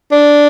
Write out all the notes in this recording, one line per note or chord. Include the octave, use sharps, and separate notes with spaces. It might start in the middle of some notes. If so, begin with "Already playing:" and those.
D4